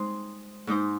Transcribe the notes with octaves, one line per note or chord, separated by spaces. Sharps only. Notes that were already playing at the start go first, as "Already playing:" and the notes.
Already playing: G#3 C4 D#4 C5
G#2 G#3 D#4 C5